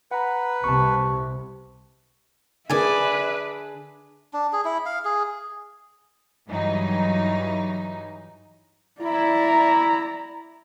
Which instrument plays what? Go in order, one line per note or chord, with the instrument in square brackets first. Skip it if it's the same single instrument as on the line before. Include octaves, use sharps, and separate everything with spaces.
[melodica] B4 [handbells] F#5 A#5
[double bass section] C2 C3 [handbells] A5 C#6
[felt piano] D3 D4 G#4 [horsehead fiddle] B4 E5 [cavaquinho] D5 G#5
[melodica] D4
G#4
E4
F5
G#4
[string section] G2 E3 F#3 D#4
[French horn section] E4 [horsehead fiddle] D5 A#5